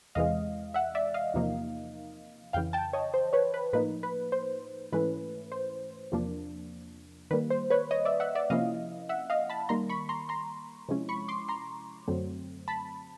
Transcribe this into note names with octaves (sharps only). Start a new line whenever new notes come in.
E2 C3 E3 G#3 D#5 F5
E5 F#5
D5 E5
D#5 F5
E2 C3 F3 A#3 D#4
F2 C#3 E3 F5 G5
G5 A5
C#5 D#5
C5
B4 C#5
B4
A2 F3 A#3 D#4 B4
B4
C5
G#2 E3 A3 C#4 E4 B4
C5
E2 C3 F3 A#3 D4
D#3 G3 A#3 B4
C5
B4 C#5
C#5 D#5
D5 E5
E5 F#5
D5 E5
C3 F3 A#3 C#4 E4 D#5 F5
E5 F#5
D#5 F5
A5 B5
D#3 G3 A#3 A#5 C6
B5 C#6
A#5 C6
A#5 C6
C3 F3 G#3 C#4 E4
B5 C#6
C6 D6
A#5 C6
F#2 D3 F#3 A3 C4
A5 B5